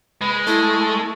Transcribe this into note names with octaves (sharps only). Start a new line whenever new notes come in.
G#3 B4
A3 E4